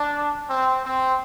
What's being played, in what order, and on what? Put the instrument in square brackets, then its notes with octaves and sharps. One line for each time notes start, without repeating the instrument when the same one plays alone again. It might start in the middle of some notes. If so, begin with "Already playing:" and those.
Already playing: [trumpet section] D4
C4
C4